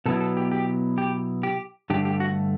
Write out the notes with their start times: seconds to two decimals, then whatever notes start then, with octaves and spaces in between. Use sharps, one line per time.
0.06 B2 F#3 B3 E4 A4
0.21 A4
0.37 G4
0.51 G4
0.98 G4
1.43 G4
1.90 G2 D3 A3 G4
2.05 G4
2.20 F#4